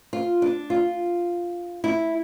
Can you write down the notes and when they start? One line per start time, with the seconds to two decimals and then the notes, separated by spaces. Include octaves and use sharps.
0.13 F4
0.42 D4
0.70 F4
1.84 E4